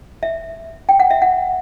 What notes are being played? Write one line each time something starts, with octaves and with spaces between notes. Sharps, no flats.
E5
G5
F#5
E5
F#5